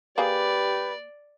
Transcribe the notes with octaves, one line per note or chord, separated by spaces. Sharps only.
A#3 G4 G#4 B4 D5